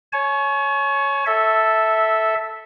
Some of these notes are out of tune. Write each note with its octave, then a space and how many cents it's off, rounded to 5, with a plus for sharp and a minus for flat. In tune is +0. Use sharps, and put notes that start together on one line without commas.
C#5 +0 G#5 +40
A4 +0 E5 -10